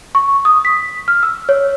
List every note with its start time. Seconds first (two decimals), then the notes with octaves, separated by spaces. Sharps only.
0.15 C#6
0.45 D#6
0.65 B6
1.08 F6
1.23 E6
1.49 C#5